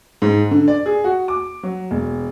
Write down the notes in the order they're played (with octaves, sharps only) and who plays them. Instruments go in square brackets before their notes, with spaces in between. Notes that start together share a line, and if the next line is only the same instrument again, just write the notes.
[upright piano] G#2
D3
D5
G#4
F#4
D6
F#3
E1